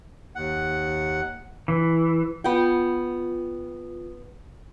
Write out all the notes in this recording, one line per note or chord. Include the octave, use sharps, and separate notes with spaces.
D#2 F#5
E3
B3 F4 G5